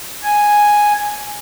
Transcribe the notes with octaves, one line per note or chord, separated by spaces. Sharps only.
G#5